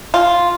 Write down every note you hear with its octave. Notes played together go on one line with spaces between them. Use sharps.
F4